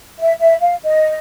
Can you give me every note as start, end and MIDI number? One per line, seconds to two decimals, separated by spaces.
0.19 0.33 76
0.39 0.54 76
0.61 0.75 77
0.83 1.19 75